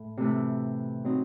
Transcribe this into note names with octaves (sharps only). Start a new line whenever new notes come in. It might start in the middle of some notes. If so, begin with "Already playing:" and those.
Already playing: A2
C3 E3 A3 E4
F#3 C4 D#4